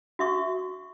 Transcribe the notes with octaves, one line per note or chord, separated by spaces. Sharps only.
F#4 E5 C#6